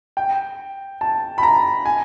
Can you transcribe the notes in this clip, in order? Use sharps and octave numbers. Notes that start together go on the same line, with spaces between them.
G5
A5
B5
A#5
G#5